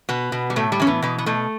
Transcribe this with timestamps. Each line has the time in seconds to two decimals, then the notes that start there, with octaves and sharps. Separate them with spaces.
0.09 B2 B3
0.32 B2
0.50 G3
0.56 A2 A3
0.72 G3
0.80 E3 C#4
0.87 B3
1.02 B2 B3
1.18 B3
1.26 B2 A3